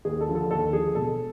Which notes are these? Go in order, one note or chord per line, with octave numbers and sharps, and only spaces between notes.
D#2 G#4
A4
D3 F3
A4
D#2 A4
D3 F3 G#4
E1 A4